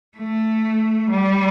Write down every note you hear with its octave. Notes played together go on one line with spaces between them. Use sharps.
A3
G3